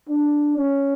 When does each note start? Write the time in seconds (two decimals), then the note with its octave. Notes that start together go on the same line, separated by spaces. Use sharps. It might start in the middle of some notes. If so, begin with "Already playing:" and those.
0.09 D4
0.57 C#4